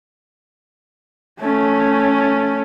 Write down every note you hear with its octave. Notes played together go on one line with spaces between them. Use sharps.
A3 C#4